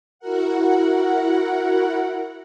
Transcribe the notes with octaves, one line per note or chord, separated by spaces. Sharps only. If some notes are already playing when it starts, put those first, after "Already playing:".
E4 F#4 A#4 F#5